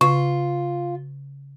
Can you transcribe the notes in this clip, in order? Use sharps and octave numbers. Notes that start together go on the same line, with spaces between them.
C#3 F4